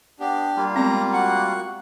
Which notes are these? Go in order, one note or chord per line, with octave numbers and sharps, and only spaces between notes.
B3 D4 G4
G3 A#3 F4
G#3 B3 C4 A#5
F#4 F#5